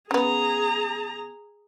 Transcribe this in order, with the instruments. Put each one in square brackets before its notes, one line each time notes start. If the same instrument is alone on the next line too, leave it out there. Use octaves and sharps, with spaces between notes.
[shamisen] C#3 B3 [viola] G#4 A#5